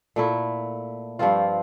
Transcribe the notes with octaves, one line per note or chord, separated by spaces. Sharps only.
A#2 A3 E4
G2 F3 C4 F4